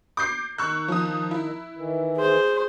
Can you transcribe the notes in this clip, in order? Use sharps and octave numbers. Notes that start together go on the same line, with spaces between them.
D6 G6 C7
D#3 A#5 C#6 E6 F#6
F3 D#6
E4
D#3 E3
G#4 C5